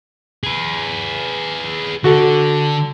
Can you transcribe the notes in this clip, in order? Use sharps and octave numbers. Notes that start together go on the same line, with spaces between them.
G#4 B4
D3 F#4 A4